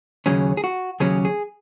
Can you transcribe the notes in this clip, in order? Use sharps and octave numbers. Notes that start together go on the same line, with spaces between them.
D#2 C#3 F#3 C#4 G#4
G#4
F#4
D#2 C#3 F#3 C#4 G#4
G#4